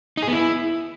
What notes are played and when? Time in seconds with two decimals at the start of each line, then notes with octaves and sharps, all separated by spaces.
0.17 D#4
0.23 G#4
0.28 B3
0.33 E4